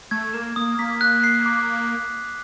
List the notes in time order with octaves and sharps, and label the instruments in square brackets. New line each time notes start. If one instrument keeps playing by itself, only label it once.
[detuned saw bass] A3 [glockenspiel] G#6
[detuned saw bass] A#3 [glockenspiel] E7
[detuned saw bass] A#3 [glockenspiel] D#6
[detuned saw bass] A#3 [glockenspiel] B6
[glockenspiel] F#6
C7
D6